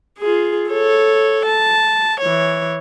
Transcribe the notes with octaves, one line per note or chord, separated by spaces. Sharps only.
F4 G#4
A4 C#5
A5
E3 C#5